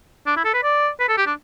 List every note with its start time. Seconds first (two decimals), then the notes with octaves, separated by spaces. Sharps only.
0.27 D4
0.36 E4
0.45 A4
0.54 B4
0.63 D5
1.00 B4
1.08 A4
1.17 G4
1.27 D4